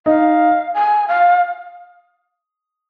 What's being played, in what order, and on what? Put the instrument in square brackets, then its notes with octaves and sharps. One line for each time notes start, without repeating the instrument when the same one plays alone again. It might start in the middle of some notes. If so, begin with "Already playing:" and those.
[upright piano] D#4 [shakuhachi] F5
[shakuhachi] G#5
F5